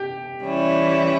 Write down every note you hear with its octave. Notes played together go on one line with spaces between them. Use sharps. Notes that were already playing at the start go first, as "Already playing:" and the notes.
Already playing: G4
E3 G3 C#4 E4